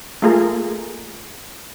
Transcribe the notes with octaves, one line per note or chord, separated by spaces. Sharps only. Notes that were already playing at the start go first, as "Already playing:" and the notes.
A3 A#3 F4 G#4 A#4